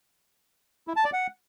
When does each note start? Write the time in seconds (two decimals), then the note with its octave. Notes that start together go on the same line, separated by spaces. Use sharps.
0.88 E4
0.96 A5
1.05 D5
1.13 F#5